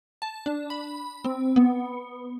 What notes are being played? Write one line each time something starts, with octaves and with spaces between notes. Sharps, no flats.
A5
D4
B5
C4
B3